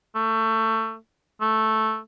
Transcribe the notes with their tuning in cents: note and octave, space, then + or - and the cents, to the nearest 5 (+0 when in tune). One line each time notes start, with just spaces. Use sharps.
A3 +20
A3 -5